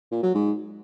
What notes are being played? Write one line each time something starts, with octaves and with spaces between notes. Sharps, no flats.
A#2
F#3
G#2